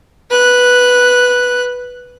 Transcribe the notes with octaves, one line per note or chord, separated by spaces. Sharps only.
B4 F#6